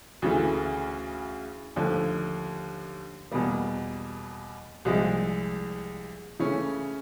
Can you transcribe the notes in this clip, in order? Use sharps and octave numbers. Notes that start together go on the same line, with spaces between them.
D2 C#3 E3 A3
D#2 D3 F3 A3
E2 B2 G3 A#3
C2 A#2 F3 G#3
C#3 E3 A3 C#4